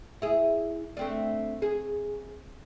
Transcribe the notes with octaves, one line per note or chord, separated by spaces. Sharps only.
E4 G#4
A3 C4 D4
G#4